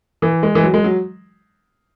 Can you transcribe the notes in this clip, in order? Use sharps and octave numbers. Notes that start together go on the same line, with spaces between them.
E3
G#3
E3
F#3
G#3
F#3